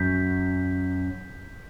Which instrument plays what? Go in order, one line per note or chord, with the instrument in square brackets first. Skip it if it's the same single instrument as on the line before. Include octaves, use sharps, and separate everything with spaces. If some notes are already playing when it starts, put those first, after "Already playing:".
Already playing: [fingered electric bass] F#2 [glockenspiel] G6 B6